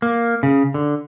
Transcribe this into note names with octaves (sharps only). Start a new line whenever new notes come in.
A#3
C#3
D3